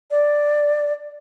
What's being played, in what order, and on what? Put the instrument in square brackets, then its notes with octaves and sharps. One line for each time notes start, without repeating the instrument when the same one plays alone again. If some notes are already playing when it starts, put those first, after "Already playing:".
[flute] D5